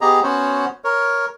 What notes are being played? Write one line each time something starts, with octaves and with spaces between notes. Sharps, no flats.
B3 G4 G#4 D#5 A#5
B3 C#4 F#4 C5 C#5
A#4 C#5